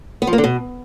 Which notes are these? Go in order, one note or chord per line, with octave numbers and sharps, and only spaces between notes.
B3
F3
A#3
D3
B2